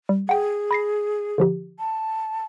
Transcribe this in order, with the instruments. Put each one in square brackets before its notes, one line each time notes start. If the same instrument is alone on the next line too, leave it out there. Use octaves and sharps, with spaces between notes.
[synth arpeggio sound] G3
[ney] G#4 [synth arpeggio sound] F#5 G5
[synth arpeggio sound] B5 A#6 C7
D3 F3 G4
[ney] A5